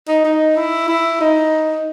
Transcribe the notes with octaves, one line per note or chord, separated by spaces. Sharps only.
D#4
D#4
E4
E4
D#4